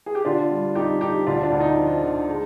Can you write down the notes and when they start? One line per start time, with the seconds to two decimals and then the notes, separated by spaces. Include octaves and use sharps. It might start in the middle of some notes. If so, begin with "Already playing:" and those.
0.06 G#4
0.15 G4
0.25 D3 D4 F4
0.51 G3
0.75 F2 D#4 G4
1.01 F2 D#4 G4
1.27 D2 D4 F4
1.43 D4
1.52 D2
1.60 D#4
1.77 F3
2.03 D3
2.29 G#3